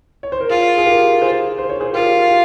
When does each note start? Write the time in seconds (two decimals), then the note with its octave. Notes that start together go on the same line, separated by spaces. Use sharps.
0.23 C#5
0.32 C5
0.41 A#4
0.50 F4 G#4
0.78 G#4
0.86 G4 A#4
1.22 G#4 C5
1.58 C5
1.70 C#5
1.80 G#4 C5
1.93 F4 G4 A#4
2.29 G4